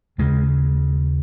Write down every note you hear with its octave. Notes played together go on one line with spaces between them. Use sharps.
D#2 C#3 G#3